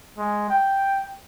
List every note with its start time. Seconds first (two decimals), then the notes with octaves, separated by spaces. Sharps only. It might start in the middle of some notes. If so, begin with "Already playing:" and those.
0.18 G#3
0.50 G5